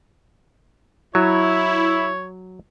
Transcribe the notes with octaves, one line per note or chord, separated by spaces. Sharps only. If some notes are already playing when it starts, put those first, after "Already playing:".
F#3 E4 C#5